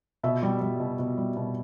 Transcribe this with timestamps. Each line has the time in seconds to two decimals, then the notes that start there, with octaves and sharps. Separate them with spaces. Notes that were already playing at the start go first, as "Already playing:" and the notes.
0.23 B2 E5
0.43 G3
0.61 G3
0.80 B2
0.99 B2
1.18 G3
1.37 B2